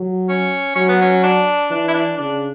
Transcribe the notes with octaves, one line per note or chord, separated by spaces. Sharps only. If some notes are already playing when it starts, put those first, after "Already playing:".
Already playing: F#3
C#4
F#3 C#4
B3
C#4
D4
E3 D4
E4
D4
C#3 D4